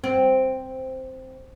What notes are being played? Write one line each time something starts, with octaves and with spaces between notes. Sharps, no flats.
C4